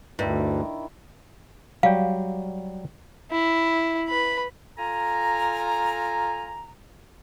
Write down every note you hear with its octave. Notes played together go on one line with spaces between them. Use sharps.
D2 G2 D#3 E4
F#3 G3 F5 G5
E4
B4 B5
F4 A4 G#5 A#5